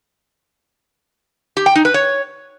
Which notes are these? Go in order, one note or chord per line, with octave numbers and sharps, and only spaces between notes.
G4
G5
D#4
B4
C#5